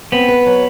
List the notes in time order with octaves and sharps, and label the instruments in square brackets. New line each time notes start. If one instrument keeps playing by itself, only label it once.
[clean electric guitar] B3 [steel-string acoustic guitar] C4
[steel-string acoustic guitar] B4
F#3